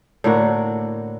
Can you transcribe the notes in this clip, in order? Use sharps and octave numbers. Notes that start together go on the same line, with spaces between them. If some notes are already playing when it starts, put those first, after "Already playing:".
A2 D3 A#3 F#4